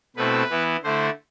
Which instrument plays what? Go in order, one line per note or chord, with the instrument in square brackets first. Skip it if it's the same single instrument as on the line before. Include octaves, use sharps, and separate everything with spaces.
[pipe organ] B2 A3 C4 E4 B4
E3 B3 E4
D3 A3 E4 C5